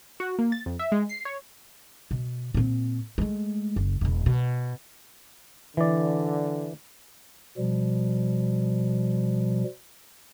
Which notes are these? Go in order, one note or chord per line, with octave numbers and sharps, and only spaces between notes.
F#4
A#3
A6
F2
E5
G#3
C7
C#5
B2
A#2 C4
G#3 A3
F#1
E1 B2
B2
D3 E3 D5
B2 F3 G3